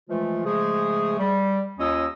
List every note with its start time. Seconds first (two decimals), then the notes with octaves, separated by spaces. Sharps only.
0.09 E3 F3 G#3 A3 F4
0.45 C#3 F3 G#3 A3 G#4
1.19 G3
1.79 D#2 C#4 F4 D#5 D#6 E6